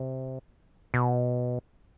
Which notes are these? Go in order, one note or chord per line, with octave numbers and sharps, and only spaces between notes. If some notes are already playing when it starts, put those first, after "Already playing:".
Already playing: C3
B2